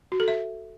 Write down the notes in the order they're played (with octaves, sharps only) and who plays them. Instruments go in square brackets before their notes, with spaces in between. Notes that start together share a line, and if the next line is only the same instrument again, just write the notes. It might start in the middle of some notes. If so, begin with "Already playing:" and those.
[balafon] F#4
A4
E5